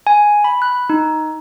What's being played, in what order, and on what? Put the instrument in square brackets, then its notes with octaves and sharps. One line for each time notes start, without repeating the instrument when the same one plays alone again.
[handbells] G#5
B5
F#6
D#4